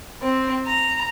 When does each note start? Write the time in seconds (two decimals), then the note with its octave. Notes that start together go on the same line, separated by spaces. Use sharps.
0.21 C4
0.65 A#5